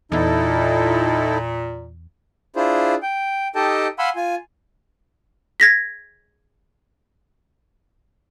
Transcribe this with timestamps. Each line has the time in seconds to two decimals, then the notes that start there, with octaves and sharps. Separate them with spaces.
0.12 E2 A#2 D#4 E4 A4
2.56 D4 E4 F4 G#4 C5
3.03 G5
3.55 D#4 G4 A4 D#5 G5 A5
3.99 F5 F#5 G#5 B5 C6 E6
4.16 F4 G#5
5.60 G#6 A#6 B6